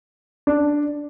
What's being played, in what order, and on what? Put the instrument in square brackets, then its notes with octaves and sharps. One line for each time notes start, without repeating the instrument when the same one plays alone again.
[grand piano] D4